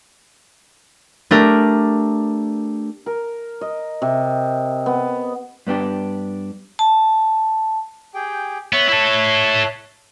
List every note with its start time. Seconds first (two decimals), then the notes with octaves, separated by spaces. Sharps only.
1.31 A3 D4 G4 A#4
3.06 A#4
3.61 D#5
4.02 C3
4.86 B3
5.67 G2 B3 D4 G4
6.79 A5
8.14 G4 G#4 G5
8.73 B3 C#5 E5 F#6
8.89 E4 A4